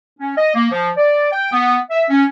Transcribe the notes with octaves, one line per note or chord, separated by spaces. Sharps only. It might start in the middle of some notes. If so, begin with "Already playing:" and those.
C#4
D#5
A#3
F3
D5
G5
B3
E5
C#4